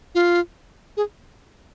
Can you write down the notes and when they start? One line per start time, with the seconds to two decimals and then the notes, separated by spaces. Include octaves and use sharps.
0.15 F4
0.97 G#4